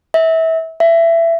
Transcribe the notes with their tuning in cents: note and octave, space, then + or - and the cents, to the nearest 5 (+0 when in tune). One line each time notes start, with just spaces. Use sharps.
E5 -25
E5 +20